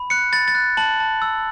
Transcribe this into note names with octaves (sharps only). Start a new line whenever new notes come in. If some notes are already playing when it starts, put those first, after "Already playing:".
Already playing: B5
F#6 C#7
B5 A6
A6
F#6
A5 F#7
A5
E6